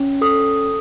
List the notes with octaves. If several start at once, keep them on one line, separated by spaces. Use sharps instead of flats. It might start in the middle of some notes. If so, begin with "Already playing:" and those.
Already playing: C#4
A4 D#6